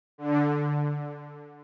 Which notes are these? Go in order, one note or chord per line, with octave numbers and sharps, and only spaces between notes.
D3